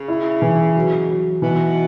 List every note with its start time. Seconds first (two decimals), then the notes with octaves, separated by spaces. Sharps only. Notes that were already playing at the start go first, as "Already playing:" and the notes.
Already playing: C#3
0.08 E4
0.42 E3
0.76 F#3
1.09 F#3
1.42 B2 E3